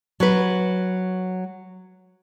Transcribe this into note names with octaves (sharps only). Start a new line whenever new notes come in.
F#3 B4